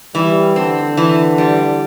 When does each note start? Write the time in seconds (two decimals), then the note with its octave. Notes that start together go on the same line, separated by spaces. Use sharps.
0.15 E3 G3
0.56 D3 C4
0.97 E3
1.38 G3